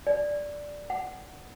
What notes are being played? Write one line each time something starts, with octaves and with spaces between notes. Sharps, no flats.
D5
F#5